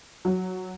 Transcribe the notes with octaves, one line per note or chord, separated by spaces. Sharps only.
F#3